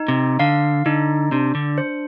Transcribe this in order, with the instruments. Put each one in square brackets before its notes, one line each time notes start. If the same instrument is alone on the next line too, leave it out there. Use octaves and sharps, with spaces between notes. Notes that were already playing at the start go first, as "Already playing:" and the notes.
Already playing: [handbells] D#4
[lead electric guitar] C3
[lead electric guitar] D3 [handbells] F5
[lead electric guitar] D3 [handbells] D#4
[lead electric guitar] C3 [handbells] D4
[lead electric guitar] D3
[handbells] C5